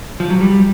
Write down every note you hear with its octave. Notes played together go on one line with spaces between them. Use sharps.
F3
F#3
G3